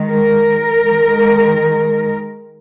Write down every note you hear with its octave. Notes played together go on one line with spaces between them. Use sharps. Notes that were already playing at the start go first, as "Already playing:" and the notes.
Already playing: D#3 G#3
A#4
D#3 G#3